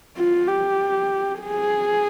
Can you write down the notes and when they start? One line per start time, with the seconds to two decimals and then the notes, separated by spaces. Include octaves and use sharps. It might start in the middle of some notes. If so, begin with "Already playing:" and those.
0.17 F4
0.47 G4
1.41 G#4